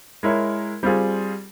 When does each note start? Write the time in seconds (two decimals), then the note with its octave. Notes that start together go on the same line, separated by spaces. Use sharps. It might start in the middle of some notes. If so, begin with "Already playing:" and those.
0.23 G#3 E4 A#4 C#5
0.83 G3 C4 F4 G#4